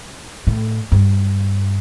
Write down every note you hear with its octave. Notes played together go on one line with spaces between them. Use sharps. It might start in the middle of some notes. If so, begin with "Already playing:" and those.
A2
G2